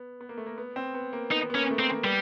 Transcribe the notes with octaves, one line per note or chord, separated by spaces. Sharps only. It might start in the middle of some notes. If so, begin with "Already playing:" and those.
Already playing: B3
B3
A#3
A3
A#3
B3
C4
B3
A#3
B3 D#4
B3
A#3 C#4
A3
A#3 C4
A#3
G3 B3